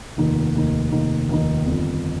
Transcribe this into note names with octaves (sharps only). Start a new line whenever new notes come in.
F1 D#2 D#3 A#3 D#4
F1 D#2 D#3 A#3 D#4
F1 D#2 D#3 A#3 D#4
F1 D#2 D#3 A#3 D#4
G1 F2 D#3